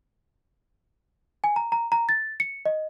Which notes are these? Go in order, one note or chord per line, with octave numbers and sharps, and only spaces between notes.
G#5
A#5
A#5
A#5
A6
C#7
D#5